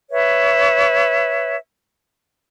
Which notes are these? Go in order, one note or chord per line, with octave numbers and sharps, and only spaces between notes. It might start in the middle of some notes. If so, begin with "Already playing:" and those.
B4 C#5 E5